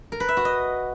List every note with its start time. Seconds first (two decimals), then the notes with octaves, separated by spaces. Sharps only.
0.12 A#4
0.20 B4
0.28 E5
0.37 F#4
0.45 D#5